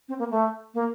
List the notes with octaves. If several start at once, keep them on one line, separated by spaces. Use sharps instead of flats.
C4
A#3
A3
A#3